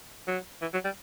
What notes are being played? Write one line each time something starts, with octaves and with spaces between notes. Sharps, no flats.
F#3
E3
F#3
G3